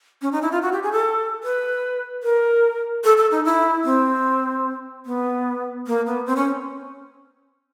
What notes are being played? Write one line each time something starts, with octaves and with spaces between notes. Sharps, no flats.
C#4
D#4
E4
F4
F#4
G4
G#4
A4
B4
A#4
A4
A4
D#4
E4
C4
B3
A#3
B3
C4
C#4